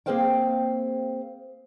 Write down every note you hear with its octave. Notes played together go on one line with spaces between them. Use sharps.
A#3 C4 G#4 C5 F5 G5